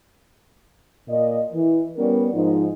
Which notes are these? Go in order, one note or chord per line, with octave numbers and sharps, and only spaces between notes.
A#2 D#5
E3
G3 B3 C#4 A#4
G#2 F3 D#4